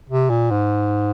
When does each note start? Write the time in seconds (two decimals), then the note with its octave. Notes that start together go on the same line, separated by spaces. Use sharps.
0.10 C3
0.30 A#2
0.51 G#2